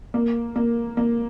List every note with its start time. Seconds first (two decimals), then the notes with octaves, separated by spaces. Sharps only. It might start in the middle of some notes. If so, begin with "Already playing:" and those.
0.14 A#3
0.56 A#3
0.97 A#3